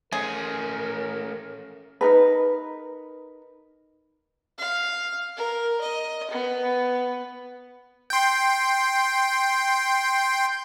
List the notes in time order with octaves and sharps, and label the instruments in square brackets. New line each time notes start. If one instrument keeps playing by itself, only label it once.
[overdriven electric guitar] A3 C#4 [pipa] G#4 [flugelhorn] A#4
[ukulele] D#4 A#4 B4
[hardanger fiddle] F5
A#4
D#5
B3
[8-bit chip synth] G5 C6